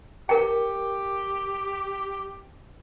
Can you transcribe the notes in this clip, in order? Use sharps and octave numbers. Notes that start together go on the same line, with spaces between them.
G4 A#4 G5